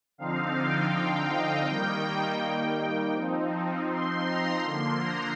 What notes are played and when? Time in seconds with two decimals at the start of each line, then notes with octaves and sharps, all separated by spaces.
0.18 D3 F3 C4 D#4 F5
0.55 G5
0.92 G5
1.29 D#5
1.66 D#3 G3 A#3 D#4 G5
3.14 F3 C4 D#4
3.88 C6
4.25 A#5
4.62 D3 F3 A#3 C6
4.99 A#5